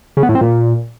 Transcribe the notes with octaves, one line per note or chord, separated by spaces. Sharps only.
C#3
B3
A2
C4
A#2